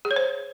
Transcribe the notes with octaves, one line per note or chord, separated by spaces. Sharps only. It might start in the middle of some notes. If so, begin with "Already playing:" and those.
G#4
C#5
C5